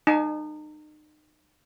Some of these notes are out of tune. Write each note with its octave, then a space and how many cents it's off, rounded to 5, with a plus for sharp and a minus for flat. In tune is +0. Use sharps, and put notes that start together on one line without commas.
D#4 -35 G#5 +40